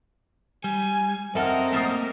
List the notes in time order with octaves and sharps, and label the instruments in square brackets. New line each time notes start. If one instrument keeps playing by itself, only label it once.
[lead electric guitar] G3 [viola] G#5
[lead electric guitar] F#2 A4 [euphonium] C4 [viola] A#4 D#5 [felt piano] E5 F#5 F6
[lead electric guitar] A3 A#3 [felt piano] D#6 A6 C7